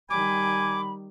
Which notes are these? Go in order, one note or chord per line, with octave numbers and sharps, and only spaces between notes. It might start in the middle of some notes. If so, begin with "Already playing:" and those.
D#3 G3 G#5 B5 D6